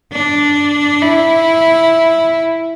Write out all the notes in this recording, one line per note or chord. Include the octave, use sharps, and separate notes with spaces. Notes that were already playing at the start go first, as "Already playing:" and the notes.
D4
E4